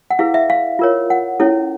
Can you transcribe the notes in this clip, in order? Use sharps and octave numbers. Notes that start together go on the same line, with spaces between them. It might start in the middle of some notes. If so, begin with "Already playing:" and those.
F#5
E4 G#4 B4 F5
E5
F5
F4 A#4 C#5
F#5
C#4 E4 A4 C#5